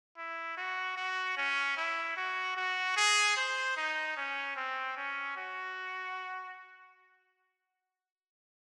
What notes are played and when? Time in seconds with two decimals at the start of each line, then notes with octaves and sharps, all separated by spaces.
0.17 E4
0.57 F#4
0.97 F#4
1.37 C#4
1.77 E4
2.17 F#4
2.57 F#4
2.97 G#4
3.37 C5
3.77 D#4
4.17 C#4
4.56 C4
4.97 C#4
5.37 F#4